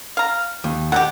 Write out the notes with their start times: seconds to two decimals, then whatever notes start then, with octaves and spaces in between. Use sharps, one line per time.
0.17 F5 A#5
0.64 D#2
0.92 B2 D#4 G4 F#5